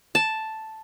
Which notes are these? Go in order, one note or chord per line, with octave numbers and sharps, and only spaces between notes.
A5